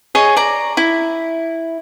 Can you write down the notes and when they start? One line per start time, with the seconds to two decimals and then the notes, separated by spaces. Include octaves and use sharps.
0.15 G#4 C#5 D#5
0.37 D5 A#5
0.77 E4